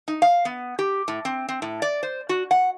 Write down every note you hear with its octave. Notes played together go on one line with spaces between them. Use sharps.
D#4
F5
B3
G4
A2
C4
C4
A2
D5
C5
F#4
F#5